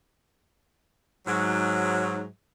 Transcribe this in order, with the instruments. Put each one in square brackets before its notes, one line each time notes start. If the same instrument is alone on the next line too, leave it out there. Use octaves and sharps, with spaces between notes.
[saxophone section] G#2 F#3